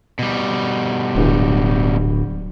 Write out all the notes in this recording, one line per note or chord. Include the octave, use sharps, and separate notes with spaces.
B2 G3
D1